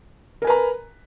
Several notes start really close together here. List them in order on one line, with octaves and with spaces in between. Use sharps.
A#4 G#5 B4 A#5